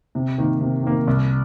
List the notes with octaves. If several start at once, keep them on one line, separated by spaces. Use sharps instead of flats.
C3
D#3 A#3
C3
D#3 A#3
C2